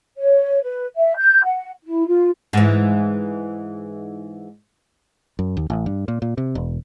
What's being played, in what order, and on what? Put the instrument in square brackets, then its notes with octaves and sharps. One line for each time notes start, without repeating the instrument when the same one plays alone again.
[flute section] C#5
B4
E5
G6
F#5
E4
F4
[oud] G#2 E3
[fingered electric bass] F#2
D#2
A1
G2
A#2
A#2
C3
E1